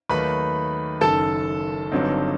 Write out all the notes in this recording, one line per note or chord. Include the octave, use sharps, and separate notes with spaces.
D#2 D#3 F#3 A3 D#4 B4 B5
F#1 F#2 D#3 A4 A5
G1 G2 F#3 C4 D#4